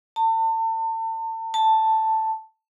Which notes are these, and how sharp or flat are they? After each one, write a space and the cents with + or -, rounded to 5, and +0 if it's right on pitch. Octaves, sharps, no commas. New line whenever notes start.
A5 +35
A5 +5